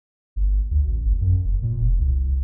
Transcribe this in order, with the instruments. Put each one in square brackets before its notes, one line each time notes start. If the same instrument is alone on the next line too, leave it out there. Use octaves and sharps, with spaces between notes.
[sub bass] G1
D2
A1
G1
F#2
F1
A#2
F1
C2